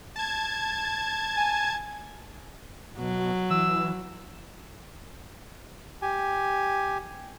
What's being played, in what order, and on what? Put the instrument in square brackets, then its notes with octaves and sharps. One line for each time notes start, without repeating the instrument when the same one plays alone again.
[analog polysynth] A5 G#6
[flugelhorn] G#5
[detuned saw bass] B2 [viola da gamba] F#3
[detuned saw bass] E3 [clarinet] E6
[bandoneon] G4 G#5